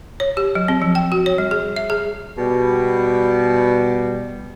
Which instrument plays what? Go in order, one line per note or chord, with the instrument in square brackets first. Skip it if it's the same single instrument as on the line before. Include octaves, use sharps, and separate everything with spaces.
[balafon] C#5
G4
F#3
C4
F3
G5
F#4
C#5
G3
G#4
E5
G#4
[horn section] B2 G3